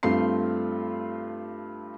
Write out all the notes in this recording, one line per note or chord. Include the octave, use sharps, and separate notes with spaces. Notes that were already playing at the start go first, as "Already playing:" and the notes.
G2 A3 C4 F4 C6 C7